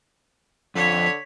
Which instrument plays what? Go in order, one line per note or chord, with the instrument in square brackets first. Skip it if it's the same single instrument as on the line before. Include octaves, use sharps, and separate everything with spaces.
[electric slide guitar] F2 [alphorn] D3 [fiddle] C#5 [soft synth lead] B6